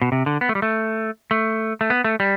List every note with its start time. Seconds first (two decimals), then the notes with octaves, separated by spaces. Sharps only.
0.02 B2
0.12 C3
0.26 D3
0.41 B3
0.49 A3
0.55 G3
0.62 A3
1.31 A3
1.81 A3
1.90 B3
2.04 A3
2.20 G3